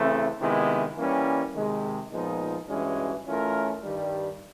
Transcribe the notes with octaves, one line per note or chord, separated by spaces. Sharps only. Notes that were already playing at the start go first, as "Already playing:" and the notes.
Already playing: C#3 E3 A3 C4
C3 D#3 G#3 B3 E4
E3 G3 A#3 C#4
C3 D#3 G#3
A#2 F3 G#3 B3 D#4
G2 E3 G#3 C#4 F#4
E3 A3 C#4 F4 A#4
G2 D#3 G3